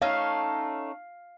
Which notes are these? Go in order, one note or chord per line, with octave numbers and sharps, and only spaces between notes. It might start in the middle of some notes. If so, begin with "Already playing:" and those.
A3 C#4 D#4 F5